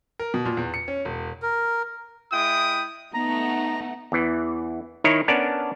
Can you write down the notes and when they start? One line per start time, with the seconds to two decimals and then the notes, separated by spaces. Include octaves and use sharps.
0.19 A#4
0.34 B2
0.45 A#2
0.57 E2
0.74 C#7
0.88 C#4
1.05 E1
1.42 A#4
2.32 G#3 E4 G5 D#6
3.14 A3 B3 D#4 F#5 A#5
4.12 E2 E3
5.04 D#3 D#4 E4 C#5
5.28 B3 C#4 D4 A#4 D5 A5